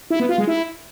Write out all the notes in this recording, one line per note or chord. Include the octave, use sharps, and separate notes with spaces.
E4
B3
F4
G#3
E4